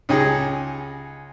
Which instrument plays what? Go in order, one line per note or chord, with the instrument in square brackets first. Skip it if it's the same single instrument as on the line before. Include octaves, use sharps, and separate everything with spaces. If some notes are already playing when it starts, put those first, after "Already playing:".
[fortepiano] C#2 C#4 D#4 G4 G#4